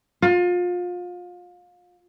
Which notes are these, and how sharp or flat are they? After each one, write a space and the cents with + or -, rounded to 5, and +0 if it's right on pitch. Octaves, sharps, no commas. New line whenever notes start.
F4 +30